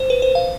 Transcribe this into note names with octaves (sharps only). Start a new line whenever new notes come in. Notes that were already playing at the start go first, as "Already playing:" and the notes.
Already playing: C5
B4
C5
F5